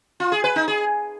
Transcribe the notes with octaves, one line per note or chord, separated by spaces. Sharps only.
F4
G#4
B4
D#4
G#4